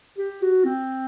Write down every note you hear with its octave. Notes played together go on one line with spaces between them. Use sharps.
G4
F#4
C4